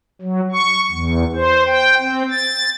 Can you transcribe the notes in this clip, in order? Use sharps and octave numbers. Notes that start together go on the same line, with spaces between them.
F#3
C#6
E2
C5
G5
C4
A6